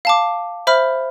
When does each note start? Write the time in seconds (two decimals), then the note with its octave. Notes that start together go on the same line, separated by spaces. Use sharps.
0.05 F5 A5 D6
0.67 C5 E5 B5 F6